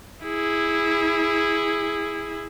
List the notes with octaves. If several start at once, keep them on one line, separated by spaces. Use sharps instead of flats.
E4 G#4